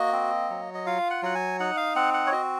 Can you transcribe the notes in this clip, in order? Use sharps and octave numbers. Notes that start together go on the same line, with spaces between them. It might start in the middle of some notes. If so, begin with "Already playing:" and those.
Already playing: A#3 F#4 D#5
C4
F#3
D#5
F4 F5
F#5
F#3 F#5
G#5
D#4 F#5
F5
C4 F#5
F#5
C#5
F#4 D#5